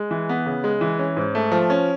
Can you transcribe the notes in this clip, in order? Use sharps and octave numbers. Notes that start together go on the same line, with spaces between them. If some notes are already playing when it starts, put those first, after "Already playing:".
Already playing: G#3
E3
B3
C#3
G#3
E3
C#4
G#2
A3
F3
C#4